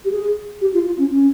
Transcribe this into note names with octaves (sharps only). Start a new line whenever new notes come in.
G4
G#4
G4
F4
F4
C#4
C#4